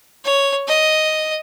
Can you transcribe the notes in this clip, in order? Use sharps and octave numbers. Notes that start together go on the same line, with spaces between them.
C#5
D#5